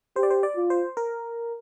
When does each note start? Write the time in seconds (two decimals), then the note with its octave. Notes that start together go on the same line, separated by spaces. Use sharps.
0.16 G4 C5
0.23 D5
0.30 C5
0.43 D5
0.56 F4
0.70 C5
0.97 A#4